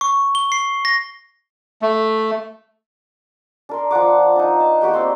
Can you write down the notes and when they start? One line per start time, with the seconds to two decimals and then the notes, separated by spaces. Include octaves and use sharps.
0.01 C#6
0.35 G7
0.52 C7
0.85 A#6
1.82 A3
3.69 D4 A#4 C6
3.91 F3 D5 F#5 D6
4.36 D4 D#4
4.60 A5
4.81 A#3 F#4 G4 G5
4.93 C4 D5 C6